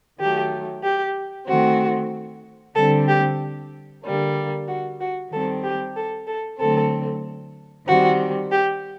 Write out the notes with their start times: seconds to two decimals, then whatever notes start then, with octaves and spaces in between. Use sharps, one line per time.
0.20 D#3 F#3 A3 G4
0.83 G4
1.48 D#3 A3 C4 F#4
2.75 D3 G3 C4 A4
3.08 G4
4.04 D3 G3 A#3
4.68 F#4
5.00 F#4
5.31 D#3 G3 C4 A4
5.64 G4
5.96 A4
6.27 A4
6.60 D3 F#3 A3 C4 A4
7.88 D#3 G3 C4 F#4
8.51 G4